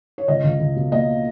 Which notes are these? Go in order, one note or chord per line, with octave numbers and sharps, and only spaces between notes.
C#5
C#2 D#5
C#2
C#2
B2
A#3 D#5